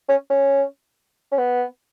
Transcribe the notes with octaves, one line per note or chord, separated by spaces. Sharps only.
C#4
C#4
C#4
B3